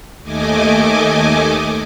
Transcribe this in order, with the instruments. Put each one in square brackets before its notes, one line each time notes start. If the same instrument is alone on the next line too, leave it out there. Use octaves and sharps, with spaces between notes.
[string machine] D#2 A3 D#5 G#5 D6